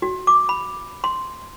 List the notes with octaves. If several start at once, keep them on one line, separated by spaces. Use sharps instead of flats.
F#4
D6
B5
C6